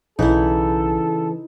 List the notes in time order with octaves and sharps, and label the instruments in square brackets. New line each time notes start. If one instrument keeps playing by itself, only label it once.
[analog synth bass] B1 [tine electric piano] C#3 E3 [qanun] D#4 E4 [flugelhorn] A4